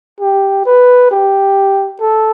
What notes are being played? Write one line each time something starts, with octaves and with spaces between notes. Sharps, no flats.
G4
B4
G4
A4